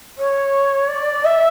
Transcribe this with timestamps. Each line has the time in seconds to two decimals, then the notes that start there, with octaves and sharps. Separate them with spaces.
0.18 C#5
0.88 D5
1.25 E5